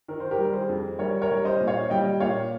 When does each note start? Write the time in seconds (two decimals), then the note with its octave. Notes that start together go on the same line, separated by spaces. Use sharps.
0.08 D#3 A#4
0.20 C5
0.31 G4 A#4
0.38 G3
0.53 G#4 C5
0.69 F2
0.99 G3 A#4 C#5
1.22 A#4 C#5
1.30 G3
1.45 C5 D#5
1.60 A#2
1.67 C#5 F5
1.90 G3 D#5 G5
2.20 A#2 C#5 F5